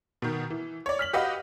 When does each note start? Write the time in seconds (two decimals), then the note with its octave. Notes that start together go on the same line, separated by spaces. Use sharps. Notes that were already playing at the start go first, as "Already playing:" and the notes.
0.22 B2 D#3
0.50 E3
0.86 C#5 D5
0.99 F6 B6 F#7
1.13 F#4 G4 B4 D#5 F5 F#5